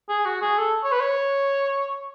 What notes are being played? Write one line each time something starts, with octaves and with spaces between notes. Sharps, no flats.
G#4
F#4
G#4
A4
C#5
B4
C#5